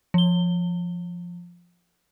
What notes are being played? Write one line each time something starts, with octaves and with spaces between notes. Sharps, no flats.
F3 G7